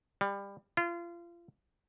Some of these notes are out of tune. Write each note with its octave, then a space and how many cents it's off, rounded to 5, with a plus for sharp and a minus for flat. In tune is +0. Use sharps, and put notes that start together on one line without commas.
G3 +25
F4 -30